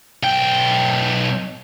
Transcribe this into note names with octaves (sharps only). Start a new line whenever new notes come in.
B1 G5